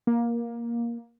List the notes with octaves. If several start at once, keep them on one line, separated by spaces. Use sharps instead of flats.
A#3